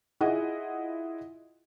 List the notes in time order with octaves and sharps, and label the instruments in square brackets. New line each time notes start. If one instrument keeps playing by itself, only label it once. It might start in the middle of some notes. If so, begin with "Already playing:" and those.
[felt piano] E4 F4 G#4 D#5 F#5